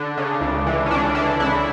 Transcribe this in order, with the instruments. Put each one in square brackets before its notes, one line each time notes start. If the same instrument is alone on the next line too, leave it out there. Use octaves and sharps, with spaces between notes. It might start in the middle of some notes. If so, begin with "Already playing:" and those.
Already playing: [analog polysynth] D3 D4
C#3
C#2
E3
C#4
C#2 D4
E3 D4
C#2 E4